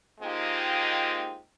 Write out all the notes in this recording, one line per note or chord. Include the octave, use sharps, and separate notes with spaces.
G#3 A#3 C4 D#4 F4 G4